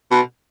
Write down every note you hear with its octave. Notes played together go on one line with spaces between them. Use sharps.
B2